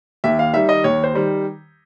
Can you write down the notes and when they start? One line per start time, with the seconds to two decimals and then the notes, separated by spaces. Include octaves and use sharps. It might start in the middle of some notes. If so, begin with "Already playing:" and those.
0.24 D#2 E5
0.39 F5
0.53 D#3 G3 E5
0.69 D#5
0.84 D#2 C#5
1.04 C5
1.14 D#3 G3